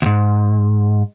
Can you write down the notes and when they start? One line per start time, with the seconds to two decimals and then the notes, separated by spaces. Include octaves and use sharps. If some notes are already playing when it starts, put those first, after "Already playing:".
0.02 D2 G#2